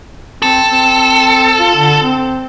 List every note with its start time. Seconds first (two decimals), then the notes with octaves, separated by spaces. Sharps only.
0.42 C4 A4
0.70 C4
1.60 F4
1.76 D3
2.02 C4